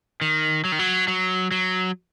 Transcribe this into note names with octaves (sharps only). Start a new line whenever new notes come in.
D#3
F#3
D#3
F#3
F#3
F#3